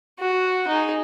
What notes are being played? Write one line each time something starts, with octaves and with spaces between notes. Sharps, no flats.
F#4
D#4 G#4